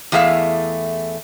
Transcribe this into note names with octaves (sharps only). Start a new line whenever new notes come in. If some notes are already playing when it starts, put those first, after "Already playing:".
E2 A3 G#4 E5 F5